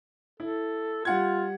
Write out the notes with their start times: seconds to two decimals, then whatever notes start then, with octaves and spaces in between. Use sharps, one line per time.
0.40 E4 A4
1.05 G3 F4 F#5 G#6